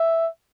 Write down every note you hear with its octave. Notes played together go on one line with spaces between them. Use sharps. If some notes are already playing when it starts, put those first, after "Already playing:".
Already playing: E5